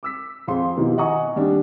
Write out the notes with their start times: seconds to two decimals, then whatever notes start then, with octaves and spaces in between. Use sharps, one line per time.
0.03 D6 E6 B6
0.47 F2 C4 G#4 F5 C6
0.76 B2 D#3 B3 D#4 E4 G4
0.98 D#5 F#5 G#5 A#5 C#6 D#6
1.36 D#2 G3 D4